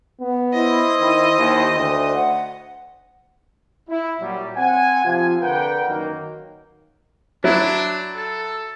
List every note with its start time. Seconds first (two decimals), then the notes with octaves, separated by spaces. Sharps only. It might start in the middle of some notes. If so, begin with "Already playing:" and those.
0.21 B3
0.53 E4 C5 D#5
1.00 D#3
1.38 D#2
1.76 D2
2.13 F#5
3.90 E4
4.21 A#2 F#3 G3
4.56 C4 F#5 G#5
5.05 C3 F3 C4 F4 G#5
5.41 D3 A#4 B4 F#5 G5
5.88 F#2 D#3 A#3
7.44 F#3 D4 E4
8.15 A4